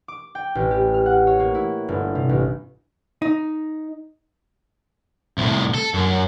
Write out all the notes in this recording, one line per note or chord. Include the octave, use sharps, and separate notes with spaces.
D6
G5
A1
G4
F6
F#5
C#5
A#3
E4
G1
C3
A1
D#4
C2 A2
A4
F#2